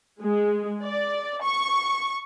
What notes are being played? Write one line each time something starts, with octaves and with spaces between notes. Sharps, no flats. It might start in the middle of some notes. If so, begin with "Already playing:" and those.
G#3
D5
C#6